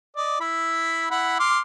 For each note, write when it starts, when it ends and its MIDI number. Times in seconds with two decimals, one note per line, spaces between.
0.16 0.38 74
0.16 0.38 75
0.41 1.06 64
0.41 1.06 83
1.11 1.39 64
1.11 1.39 78
1.11 1.39 83
1.40 1.60 84
1.40 1.60 86
1.40 1.60 89